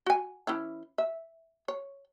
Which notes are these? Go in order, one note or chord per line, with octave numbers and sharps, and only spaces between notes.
F#4 G#5
E3 C#4 E4
E5
C#5